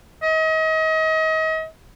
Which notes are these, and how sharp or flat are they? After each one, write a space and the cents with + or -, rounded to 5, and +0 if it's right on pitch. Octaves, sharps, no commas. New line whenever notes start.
D#5 +35